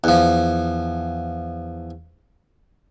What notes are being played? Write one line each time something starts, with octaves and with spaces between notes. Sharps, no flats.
E2 F3